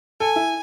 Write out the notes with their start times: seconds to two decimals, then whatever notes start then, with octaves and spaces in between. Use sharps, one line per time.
0.20 A4 G#5
0.36 E4